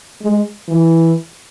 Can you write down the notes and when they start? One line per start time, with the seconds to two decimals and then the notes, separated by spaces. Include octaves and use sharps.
0.22 G#3
0.68 E3